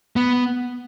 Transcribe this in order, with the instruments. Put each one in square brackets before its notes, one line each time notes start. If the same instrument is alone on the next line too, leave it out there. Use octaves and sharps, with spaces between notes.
[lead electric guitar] B3